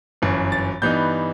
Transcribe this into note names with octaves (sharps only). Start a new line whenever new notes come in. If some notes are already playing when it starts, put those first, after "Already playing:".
G1 F#2 E3
A6
G2 E3 B3 D#4 G6